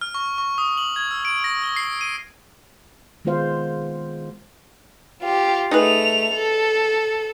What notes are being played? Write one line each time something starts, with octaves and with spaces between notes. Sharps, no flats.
F6
C#6
C#6
D#6
F#7
G#6
E6
D7
A#6
G7
C7
D#7
D#3 G#3 B3 F4 C5 F5
F4 G4
A3 D#4 G#4 B4 F7
A4